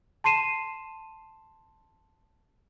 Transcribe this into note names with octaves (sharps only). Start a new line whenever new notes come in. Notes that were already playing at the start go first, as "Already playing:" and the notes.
A5 C6 C7 D#7 E7